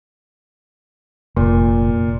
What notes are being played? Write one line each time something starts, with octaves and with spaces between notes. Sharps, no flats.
F1 A#2